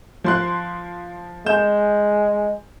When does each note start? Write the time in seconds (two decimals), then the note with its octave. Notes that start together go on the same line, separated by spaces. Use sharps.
0.24 F3 C6 F#6
1.46 G#3 G6 E7